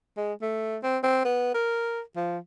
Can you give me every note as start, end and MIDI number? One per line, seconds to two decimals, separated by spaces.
0.17 0.33 56
0.42 0.78 57
0.83 0.98 60
1.03 1.23 60
1.25 1.52 59
1.54 2.01 70
2.16 2.38 53